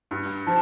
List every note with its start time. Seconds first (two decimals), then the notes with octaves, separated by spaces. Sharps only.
0.11 G2
0.47 F3 A5